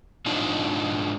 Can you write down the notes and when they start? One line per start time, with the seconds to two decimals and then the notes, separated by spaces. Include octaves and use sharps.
0.26 G#2 D4 D#4 F4